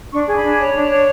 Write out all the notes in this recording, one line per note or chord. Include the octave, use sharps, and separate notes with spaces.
D4 C#6
G#4
B5
D4
C#5
D4
C#5